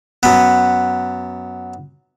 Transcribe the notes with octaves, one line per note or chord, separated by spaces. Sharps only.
F#2 B3